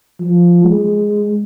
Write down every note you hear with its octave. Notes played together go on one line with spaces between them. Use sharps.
F3
G#3